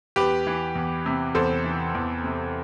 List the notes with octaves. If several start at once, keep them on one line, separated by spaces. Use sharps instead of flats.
E2 G4 B4
E3
E2
C3
E2 A4 C5
E3
E2
C3